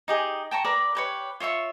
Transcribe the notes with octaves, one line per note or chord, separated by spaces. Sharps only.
D#4 G4 G#4
G5 A5 A#5 C#6
A#4 B4 D5 D6
G4 B4 C#5
F4 C#5 E5 C#6